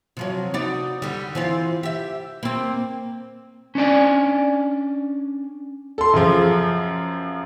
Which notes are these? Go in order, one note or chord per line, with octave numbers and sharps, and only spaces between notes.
C3 F3 F#3
D#4 F#4 D5
D3 G3
E3 C4 F4
G4 E5
A#3 C4
C#4 D4 D5 G#5
A4 C6
F#2 C#3 F3